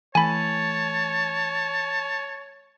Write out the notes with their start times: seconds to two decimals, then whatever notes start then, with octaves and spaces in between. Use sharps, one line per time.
0.15 E3 A3 C#5 G#5 A5 B5